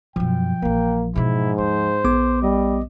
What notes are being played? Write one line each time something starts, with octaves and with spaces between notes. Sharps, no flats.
F#2 B2 F3 G5
A#1 E3 A#3
G#2 B2 E3 E4
D#2 C5
A#1 B3 D6
G3 D#5